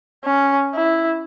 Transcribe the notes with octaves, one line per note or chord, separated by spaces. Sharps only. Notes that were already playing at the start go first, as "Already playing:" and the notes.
C#4
E4